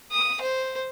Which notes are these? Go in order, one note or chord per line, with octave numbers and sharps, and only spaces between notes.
D#6
C5